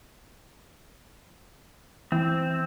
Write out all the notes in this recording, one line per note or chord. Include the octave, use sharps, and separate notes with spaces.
E3 C4